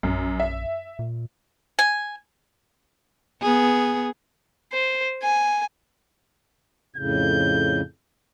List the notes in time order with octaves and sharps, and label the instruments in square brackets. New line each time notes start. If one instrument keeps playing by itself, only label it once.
[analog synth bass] A#1 [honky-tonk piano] F#2
[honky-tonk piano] E5
[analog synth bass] A#2
[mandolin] G#5
[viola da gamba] B3 G#4
[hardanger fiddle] C5
G#5
[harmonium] F2 A2 C#3 [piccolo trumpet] G6